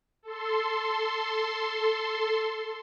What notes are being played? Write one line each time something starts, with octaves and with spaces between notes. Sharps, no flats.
A4 C6